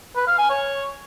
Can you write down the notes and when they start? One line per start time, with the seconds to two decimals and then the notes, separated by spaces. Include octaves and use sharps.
0.16 B4
0.27 F5
0.38 G#5
0.50 C#5